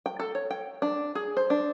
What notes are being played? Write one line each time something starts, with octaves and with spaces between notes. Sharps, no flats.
G5
A4
C#5
G5
D4
G#4
C5
D4